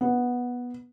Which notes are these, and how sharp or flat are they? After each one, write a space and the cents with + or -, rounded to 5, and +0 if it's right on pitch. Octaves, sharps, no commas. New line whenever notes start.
B3 -10